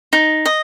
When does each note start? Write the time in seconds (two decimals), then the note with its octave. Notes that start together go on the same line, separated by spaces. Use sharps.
0.13 D#4
0.46 D#5